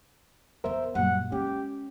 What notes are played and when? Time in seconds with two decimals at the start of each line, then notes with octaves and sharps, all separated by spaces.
0.64 F2 B3 A#4 C5 E5
0.95 F#2 A#2 G3 F#5
1.32 G#3 C#4 G4